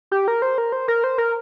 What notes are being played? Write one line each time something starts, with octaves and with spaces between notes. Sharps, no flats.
G4
A#4
C5
A#4
C5
A#4
C5
A#4